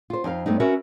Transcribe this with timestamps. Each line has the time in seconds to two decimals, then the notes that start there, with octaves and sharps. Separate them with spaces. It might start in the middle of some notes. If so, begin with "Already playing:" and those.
0.10 F4 C5
0.24 F2 D#4 A4 F5
0.46 G2 A3 B3 C4 D#4
0.60 C#4 F#4 A#4 B4 E5